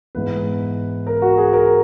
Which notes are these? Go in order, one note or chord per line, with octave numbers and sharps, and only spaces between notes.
G#2 E3 B3 B4
A#4
F#4
G#4
A#4